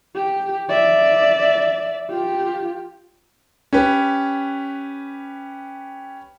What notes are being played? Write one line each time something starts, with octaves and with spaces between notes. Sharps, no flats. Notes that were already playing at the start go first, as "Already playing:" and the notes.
G4
D5 E5
F4 G4
C#4 G4 B4